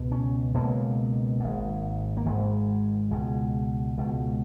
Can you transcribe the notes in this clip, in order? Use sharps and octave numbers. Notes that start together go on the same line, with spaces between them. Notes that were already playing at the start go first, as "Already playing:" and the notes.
Already playing: C#2 B2
C#4
C#2 B2 A#3
G#1 G#2
A#3
G#1 G#2 G#3
C#2 B2 G#3
C#2 B2